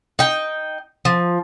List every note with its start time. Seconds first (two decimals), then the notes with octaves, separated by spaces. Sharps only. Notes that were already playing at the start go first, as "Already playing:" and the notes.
0.19 D#4 G5
1.05 F3